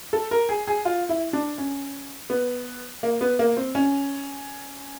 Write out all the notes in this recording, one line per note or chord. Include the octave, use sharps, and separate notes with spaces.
A4
A#4
G#4
G#4
F4
E4
D4
C#4
B3
A#3
B3
A#3
C4
C#4